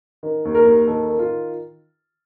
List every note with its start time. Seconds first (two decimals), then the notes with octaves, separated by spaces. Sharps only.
0.23 D#3
0.45 D#2
0.55 A#4
0.65 D#2
0.87 D#3 A4
1.09 D#3
1.19 F4